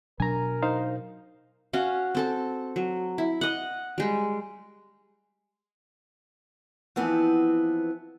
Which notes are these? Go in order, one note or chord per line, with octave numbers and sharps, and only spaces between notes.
B2 F#3 D4 A#4 G#5 A#5
D#4 C5 F5
C#4 F#4 F5
C4 A4 A5
F#3
E4
D#5 F#5
G3 G#3
E3 F3 B3 C4